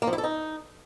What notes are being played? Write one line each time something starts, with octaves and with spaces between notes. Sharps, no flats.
A#3
F3
E4
A4
D#4